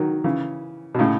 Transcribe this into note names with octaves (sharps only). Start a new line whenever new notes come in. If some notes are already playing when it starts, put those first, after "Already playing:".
Already playing: D#3 F#3
C#3 E3
B2
A2 C#3